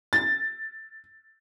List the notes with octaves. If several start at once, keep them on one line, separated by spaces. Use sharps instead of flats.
A6